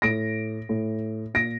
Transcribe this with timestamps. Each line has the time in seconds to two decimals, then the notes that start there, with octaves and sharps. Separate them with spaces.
0.02 A2 A#6 D7
0.69 A2
1.34 A#2 A#6 D7